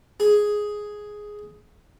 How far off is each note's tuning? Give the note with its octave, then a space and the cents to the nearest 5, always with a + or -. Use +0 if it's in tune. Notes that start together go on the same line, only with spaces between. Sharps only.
G#4 +5